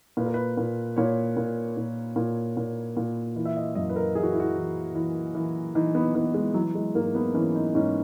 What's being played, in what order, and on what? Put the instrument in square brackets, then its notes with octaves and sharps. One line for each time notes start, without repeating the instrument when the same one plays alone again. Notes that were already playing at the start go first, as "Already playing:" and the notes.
[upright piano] A#2 B4
A#4
B4
A#2
A#2 C#5
A#2
A#2
A#2
A#2
A#2
E3
E5
D#5
F#2 D#5
B4
A#4
E3 G#4
F#4
E4
F#4
E3
E3
E3
E3 D#4
B3
E3 B3
G#3
E3 F#3
G#3
G#2 A#3
B3
E3 C#4
D#4
G#2 C#4